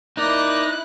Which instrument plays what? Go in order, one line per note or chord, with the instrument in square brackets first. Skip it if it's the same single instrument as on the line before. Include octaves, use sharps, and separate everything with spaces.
[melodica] A#3 D5 [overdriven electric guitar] D#4 [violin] E4 F#6